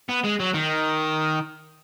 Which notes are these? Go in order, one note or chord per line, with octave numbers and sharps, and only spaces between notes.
B3
G#3
F#3
D#3